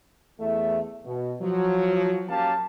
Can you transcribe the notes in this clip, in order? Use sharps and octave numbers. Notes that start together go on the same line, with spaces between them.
E2 A3 E5
B2
F3 F#3
F#3 A#3 C#4 G4 F5 A5